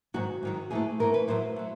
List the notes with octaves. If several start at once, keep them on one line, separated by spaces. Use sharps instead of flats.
G#2 D#3 F#3 F#4
G#2 D#3 F#3
G#2 E3 A3 G#4
G#2 E3 A3 A#4
B4
A2 F#3 A3 C5
F#3 A3